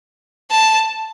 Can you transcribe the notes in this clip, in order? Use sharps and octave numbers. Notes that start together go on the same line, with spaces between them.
A5